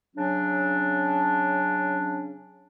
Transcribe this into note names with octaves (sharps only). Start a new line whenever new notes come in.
C#3 F#3 C#4 D4